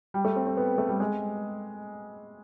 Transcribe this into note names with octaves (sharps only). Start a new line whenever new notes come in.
G3
A3
C4
C4
B3
A3
G3
G#3